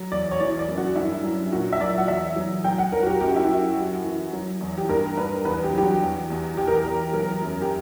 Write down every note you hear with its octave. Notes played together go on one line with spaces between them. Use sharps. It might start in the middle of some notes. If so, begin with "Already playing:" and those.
Already playing: F#3
E2 D5
C#5
E3 D5
D5
F#2
F#4
G2 E4
F#3
A#2 F#4
E5
F#3 D5
F#5
E2 E5
F#3
F#3 G5
F#5
F#3 A#4
F#4
G4
F#2 G4
F#4
E4
F#2 F#4
F#2
E3
F#3
E2
G4
G2 A#4
G2 B4
E2 B4
G4
F#3
G4
F#4
E2
E2
E2 G4
A#4
G4
E2
F#3 A#4
F#2
G4